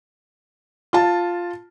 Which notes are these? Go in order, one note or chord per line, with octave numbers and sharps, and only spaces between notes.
F4 A5